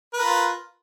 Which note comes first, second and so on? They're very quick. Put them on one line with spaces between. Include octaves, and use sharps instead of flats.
B4 A#4 F4